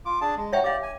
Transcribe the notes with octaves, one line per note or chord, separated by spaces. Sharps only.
F4 D6
D4 G#4 A5
G#3
D#4 F#4 C#5 E5 G5 A#5
G4 D5 F5 D6
G#5